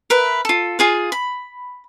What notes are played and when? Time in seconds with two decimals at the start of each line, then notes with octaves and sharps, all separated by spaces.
0.10 A#4 B4 E5
0.45 F4 A4
0.79 F4 G#4 F5
1.12 B5